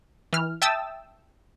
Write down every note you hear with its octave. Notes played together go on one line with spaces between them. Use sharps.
E3 F6
E5 G5 A5 D#6 E6 A6